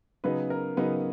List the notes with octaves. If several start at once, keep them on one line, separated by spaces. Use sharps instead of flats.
C#3 F#3 B3 D#4 B4
A#4
C#3 F#3 B3 D#4 B4